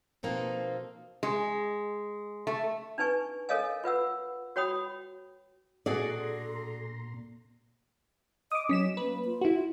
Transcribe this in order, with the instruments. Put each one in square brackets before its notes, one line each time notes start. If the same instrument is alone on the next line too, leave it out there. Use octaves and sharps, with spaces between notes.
[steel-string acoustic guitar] B2 F3 A#3 C4 D#4 A4
[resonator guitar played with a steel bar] G#3
A3
[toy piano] D4 D#4 B4 G#5 C#6
A4 A#4 C#5 D#5 F5 G#5
F4 B4 F#5 E6
F#4 C#5 G5 B5 D#6
[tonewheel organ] A#2 A#5 C6 [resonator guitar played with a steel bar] D4 F#4 G#4 [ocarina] A4 [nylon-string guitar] D5
[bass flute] D#5 [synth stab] D6 D#6
[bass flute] F#3 [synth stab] C#4 B6 E7
[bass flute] A#3 [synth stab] B4
[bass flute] F4
[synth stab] E4 F#4